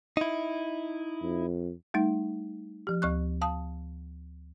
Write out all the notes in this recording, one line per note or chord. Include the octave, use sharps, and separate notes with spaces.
D#4 E4
F2
G3 A3 D#4
F3 G4
D2 C#6 F#6
F5 A5 D#6